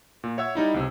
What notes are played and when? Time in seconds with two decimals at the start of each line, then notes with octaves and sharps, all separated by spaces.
0.24 A#2
0.38 C#5 E5 F#5 E6 G#6
0.55 G3 D#4 E4
0.74 C#2 C3